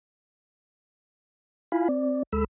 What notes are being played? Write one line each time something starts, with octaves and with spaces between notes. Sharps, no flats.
E4 F4 F5 G#5 B5
C4 D5
D2 G#3 A4 B5 E6